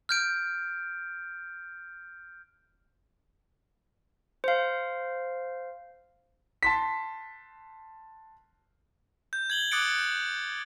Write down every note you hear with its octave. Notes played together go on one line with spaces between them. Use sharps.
F6 G6 D7
C5 F5
A5 C6 B6
G6
G#6 F#7 G7
D6 D#6 F#6 A6 C#7 D7